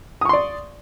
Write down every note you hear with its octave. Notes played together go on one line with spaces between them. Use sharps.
D5 C6 C#6 D#6